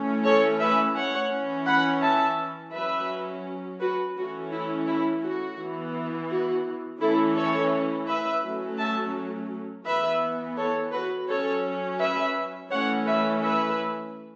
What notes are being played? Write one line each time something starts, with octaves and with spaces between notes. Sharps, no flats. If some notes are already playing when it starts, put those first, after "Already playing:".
Already playing: E3 A3 C#4
A4 C#5
B4 E5
C#5 F#5
E3 C#4
F#5 B5
E5 A5
F#3 C#4 B4 E5
F#4 B4
E3 A3 C#4 F#4
E4
E4
F#4
E3 B3
F#4
E3 A3 C#4 E4 A4
A4 C#5
B4 E5
F#3 A3 C#4
E5 A5
E3 B3 B4 E5
A4 C#5
F#4 B4
F#3 C#4 A4 C#5
B4 E5
E3 A3 C#4 C#5 F#5
B4 E5
B4 E5